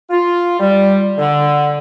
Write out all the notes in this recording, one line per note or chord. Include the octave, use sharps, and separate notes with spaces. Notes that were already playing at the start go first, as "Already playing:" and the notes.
F4
G3
D3